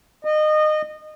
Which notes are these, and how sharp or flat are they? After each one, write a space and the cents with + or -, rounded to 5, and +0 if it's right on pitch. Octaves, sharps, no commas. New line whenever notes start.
D#5 -25